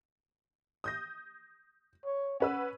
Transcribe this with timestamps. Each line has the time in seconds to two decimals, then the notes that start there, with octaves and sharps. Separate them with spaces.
0.84 D#6 G6 A#6
2.06 C#5
2.40 C#4 B4 F#5 E6